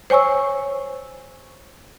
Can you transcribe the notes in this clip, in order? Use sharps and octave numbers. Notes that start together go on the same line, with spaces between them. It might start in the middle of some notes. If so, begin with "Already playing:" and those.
C5 C#5 G#5 C#6 E6